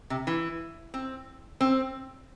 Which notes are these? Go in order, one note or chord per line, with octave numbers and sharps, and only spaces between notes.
C3
E3
C4
C4